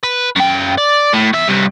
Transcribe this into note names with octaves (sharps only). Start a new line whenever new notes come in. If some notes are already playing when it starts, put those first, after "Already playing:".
B4
F#2 G5
D5
A2
E2 E5
G2 C3